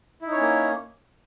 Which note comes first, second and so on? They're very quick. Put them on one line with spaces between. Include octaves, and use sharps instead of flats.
E4 D#4 C#5 C#4 A#3